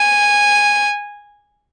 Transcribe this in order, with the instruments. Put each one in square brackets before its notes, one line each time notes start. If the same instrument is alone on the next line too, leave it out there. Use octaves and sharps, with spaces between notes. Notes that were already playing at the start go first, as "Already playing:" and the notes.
Already playing: [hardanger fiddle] G#5